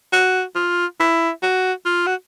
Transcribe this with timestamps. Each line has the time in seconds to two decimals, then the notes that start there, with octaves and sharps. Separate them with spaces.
0.13 F#4
0.56 F4
1.00 E4
1.43 F#4
1.85 F4
2.07 F#4